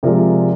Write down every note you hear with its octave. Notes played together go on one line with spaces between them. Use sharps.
C3 F3 G#3 A#4 D5